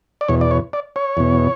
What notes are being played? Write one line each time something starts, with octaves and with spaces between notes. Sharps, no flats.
D5
E2 B2 C#5
D5
C#5
D5
C#5
E2 B2